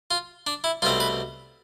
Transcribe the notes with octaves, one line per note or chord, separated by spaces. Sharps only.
F4
D4
E4
C2 B2 A3 C4 F4
B4